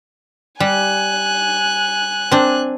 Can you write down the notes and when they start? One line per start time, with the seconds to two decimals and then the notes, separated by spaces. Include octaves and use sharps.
0.60 G3 G#5 F#6
2.32 C4 D4